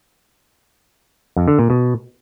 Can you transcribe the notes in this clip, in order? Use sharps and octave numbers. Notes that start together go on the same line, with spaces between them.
F2
D3
A#2
B2